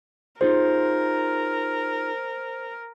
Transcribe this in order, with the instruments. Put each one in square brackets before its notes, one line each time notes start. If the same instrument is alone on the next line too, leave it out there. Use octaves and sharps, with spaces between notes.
[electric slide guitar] D#4 F4 G#4 [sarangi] A#4 [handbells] C5